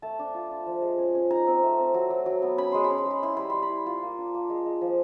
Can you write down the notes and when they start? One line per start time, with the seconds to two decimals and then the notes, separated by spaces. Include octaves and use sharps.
0.02 A3 A5
0.19 D4
0.34 F4
0.51 D4
0.67 F3
0.82 G#3
0.98 C#4
1.15 C#4
1.30 D#4 A#5
1.47 C4
1.63 A3
1.78 C4
1.94 F#3
2.10 F#3
2.26 F#3
2.42 B3
2.58 C#4 B5
2.72 G#3 C6
2.84 B5
2.90 C#4
2.98 C6
3.06 G#3 B5
3.22 E4 C6
3.37 G3 B5
3.50 G3 C6
3.63 B5
3.69 E4
3.86 F4 C6
4.03 A#3
4.18 D4
4.34 A#3
4.50 G#3
4.66 G#3
4.81 F3